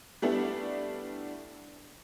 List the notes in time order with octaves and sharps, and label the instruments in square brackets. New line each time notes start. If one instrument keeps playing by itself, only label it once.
[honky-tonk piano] G3 A3 B3 D4 E4